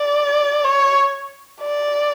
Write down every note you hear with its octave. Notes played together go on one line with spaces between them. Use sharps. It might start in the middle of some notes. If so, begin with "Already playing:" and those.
Already playing: D5
C#5
D5